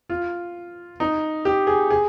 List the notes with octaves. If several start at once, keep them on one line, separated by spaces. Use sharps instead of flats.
F4
D#4
G4
G#4
G#4